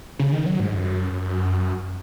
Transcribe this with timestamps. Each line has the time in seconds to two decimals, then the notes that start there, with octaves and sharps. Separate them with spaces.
0.19 C#3
0.32 D#3
0.46 F#3
0.60 G#2
0.74 F#2